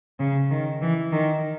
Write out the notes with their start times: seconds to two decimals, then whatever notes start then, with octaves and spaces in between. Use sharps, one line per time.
0.20 C#3
0.51 D#3
0.82 E3
1.12 D#3